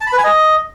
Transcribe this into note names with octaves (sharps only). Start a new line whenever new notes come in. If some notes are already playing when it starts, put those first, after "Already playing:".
A5
B5
B4
G#5
D#5